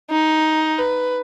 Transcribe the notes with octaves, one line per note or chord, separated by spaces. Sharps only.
D#4
B4